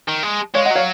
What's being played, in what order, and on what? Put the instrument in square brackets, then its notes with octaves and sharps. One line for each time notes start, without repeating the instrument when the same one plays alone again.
[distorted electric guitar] D#3
G#3
[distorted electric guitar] G#3 [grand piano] C#5 F5
[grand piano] D#5 F#5
[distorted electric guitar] F#3 [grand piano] C#5 F5